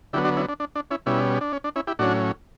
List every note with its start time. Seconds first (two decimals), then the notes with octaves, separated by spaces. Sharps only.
0.13 D3 F#3 B3 E4 G4
0.25 D4 F#4
0.37 C#4 E4
0.49 D4
0.60 D4
0.75 D4
0.91 C#4 E4
1.06 B2 G3 C#4 E4
1.41 D4
1.53 C#4
1.64 D4
1.76 C#4 E4
1.87 E4 G4
1.99 A2 F#3 C#4 D4 F#4